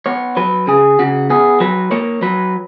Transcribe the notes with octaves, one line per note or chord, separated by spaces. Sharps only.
B3 C#5
F#3 B4
C#3 G#4
C#3 F#4
B3 G#4
F#3 B4
A#3 C#5
F#3 B4